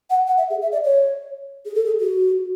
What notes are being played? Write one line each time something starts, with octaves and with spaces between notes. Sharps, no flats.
F#5
F#5
E5
G#4
E5
D5
C#5
G#4
A4
G#4
F#4